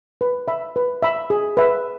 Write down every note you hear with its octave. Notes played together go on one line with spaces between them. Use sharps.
B4
E5 B5
B4
E5 B5
G#4
B4 E5